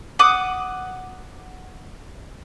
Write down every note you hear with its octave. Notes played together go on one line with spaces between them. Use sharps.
F#5 D6 D#6